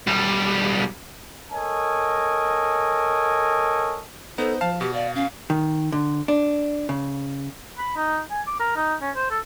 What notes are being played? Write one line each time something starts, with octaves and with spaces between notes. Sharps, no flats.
B1 G3
A4 A#4 C#5 D#5 G#5
B3 D#4 A4 C5
F3 F5 A5
B2 G4
D5 F5
C#4 F5
D#3
D3
D4
C#3
B5
D#4
G#5
D6
A#4
D#4
C#4
C5
A4